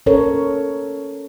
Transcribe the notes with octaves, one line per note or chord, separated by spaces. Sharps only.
C#4 A4 A#4 C#5